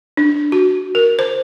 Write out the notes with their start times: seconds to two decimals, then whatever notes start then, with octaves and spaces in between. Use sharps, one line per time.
0.17 D4
0.52 F#4
0.95 A#4
1.19 C5